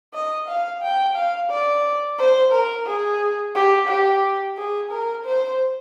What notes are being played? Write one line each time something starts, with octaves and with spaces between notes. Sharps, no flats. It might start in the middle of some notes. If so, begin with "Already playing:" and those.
D#5
F5
G5
F5
D5
C5
A#4
G#4
G4
G4
G#4
A#4
C5